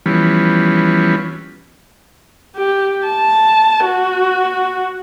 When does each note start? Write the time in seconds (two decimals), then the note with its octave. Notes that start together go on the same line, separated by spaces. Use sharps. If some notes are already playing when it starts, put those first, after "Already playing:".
0.06 E3 F3 G3 B3 C#4
2.57 G4
3.07 A5
3.85 F#4